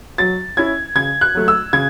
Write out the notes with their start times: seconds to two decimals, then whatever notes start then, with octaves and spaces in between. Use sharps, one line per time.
0.18 F#3 A6
0.57 C#4 E4 G#6
0.95 C#3 G#6
1.21 F#6
1.35 F#3 A3
1.48 E6
1.73 C#3 G#6